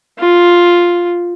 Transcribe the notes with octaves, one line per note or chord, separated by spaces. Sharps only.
F4